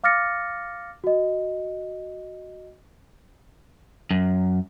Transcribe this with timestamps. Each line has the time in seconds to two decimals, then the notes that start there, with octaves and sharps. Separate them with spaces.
0.04 F5 D6 F6 A6 A#6 C#7
1.04 F#4 D#5
4.11 F#2